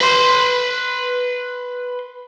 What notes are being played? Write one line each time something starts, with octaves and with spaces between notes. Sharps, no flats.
B4 C6